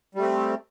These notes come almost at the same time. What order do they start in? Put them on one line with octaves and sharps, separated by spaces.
G3 A3 C4